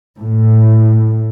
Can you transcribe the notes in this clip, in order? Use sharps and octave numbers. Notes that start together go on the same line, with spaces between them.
A2